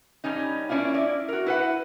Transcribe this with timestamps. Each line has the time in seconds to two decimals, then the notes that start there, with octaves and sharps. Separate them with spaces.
0.24 G2 G3 C#4 D#4
0.69 A#3 C#4 D4 E4 F4
0.94 E4 D5
1.28 F#4 A#4
1.46 E4 B4 F#5